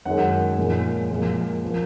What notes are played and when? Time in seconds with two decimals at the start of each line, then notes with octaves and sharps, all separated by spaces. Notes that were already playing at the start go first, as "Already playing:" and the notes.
0.05 F#2 D#3 G#3 F#5
0.58 A#2 F3 G#3
1.11 A#2 F3 G#3
1.64 F3 A#3